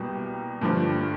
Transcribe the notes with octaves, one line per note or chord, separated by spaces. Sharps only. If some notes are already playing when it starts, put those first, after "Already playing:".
Already playing: C2 B2 G3 A#3 G4
G2 D3 F3 A3